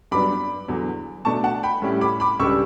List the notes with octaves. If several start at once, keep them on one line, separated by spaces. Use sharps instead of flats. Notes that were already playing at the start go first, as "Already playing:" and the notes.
G2 F#3 B3 D4 B5 D6
E2 D3 F#3
B2 A3 D4 A5 C#6
F#5 A5
G5 B5
A2 G3 C#4 E4
B5 D6
B5 D6
C#2 C#3 G3 D4 C#6 E6